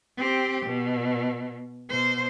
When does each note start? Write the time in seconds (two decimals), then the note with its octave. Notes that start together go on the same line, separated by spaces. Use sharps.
0.18 C4 G4
0.66 B2
1.89 B2 C5